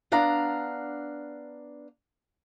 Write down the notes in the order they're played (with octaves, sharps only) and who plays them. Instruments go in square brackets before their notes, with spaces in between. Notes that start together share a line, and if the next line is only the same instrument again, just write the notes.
[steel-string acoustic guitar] B3 D4 F5 F#5 A#5